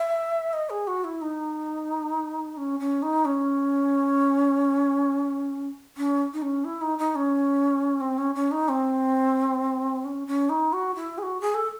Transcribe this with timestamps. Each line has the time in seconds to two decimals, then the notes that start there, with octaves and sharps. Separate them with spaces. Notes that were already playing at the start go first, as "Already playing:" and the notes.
Already playing: E5
0.53 D#5
0.70 G#4
0.87 F#4
1.04 E4
1.21 D#4
2.57 C#4
2.80 C#4
3.02 D#4
3.25 C#4
5.97 C#4
6.33 D#4
6.42 C#4
6.65 E4
6.82 D#4
6.98 D#4
7.16 C#4
8.01 C4
8.18 C#4
8.35 C#4
8.51 D#4
8.69 C4
10.05 C#4
10.27 C#4
10.49 D#4
10.73 F#4
10.95 E4
11.18 G#4
11.23 F#4
11.41 G#4
11.54 A4